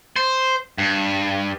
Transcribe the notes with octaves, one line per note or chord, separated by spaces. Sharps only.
C5
G2